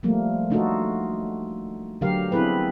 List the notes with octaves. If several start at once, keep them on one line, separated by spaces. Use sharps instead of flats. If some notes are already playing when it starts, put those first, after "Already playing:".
F3 G3 A3 A#3
A3 D4 D#4 F4 F#4 A4
D3 F#3 G4 A#4 F5
B3 C4 D4 E4 G#4 B4